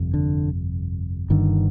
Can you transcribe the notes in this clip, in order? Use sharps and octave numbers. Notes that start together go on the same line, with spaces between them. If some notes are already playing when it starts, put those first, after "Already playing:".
Already playing: G1 F2 C3
D3
G1 G2 D3 D#3